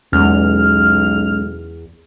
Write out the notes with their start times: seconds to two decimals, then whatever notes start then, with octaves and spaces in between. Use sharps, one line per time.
0.13 B1 E2 G#3 C#4 F6